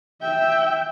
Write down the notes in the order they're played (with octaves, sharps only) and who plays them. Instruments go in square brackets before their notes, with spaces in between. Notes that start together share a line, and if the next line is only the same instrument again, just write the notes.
[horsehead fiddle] E5 G5